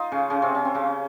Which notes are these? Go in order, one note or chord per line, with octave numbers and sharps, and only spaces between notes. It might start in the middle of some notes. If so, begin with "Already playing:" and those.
Already playing: D#4 F4
C#3 C#4
C#3 C#4
C3 C4
C#4
C4
C#3 C#4